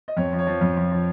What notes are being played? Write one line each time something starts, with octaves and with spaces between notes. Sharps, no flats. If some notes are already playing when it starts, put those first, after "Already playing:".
D#5
F2 C#5
F3
C#5
F3
F2
F3
F3